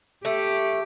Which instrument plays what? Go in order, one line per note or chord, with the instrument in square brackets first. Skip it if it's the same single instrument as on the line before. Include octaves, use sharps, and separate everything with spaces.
[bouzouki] A3 [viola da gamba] G4